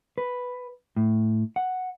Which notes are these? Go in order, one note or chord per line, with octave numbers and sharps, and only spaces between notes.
B4
A2
F#5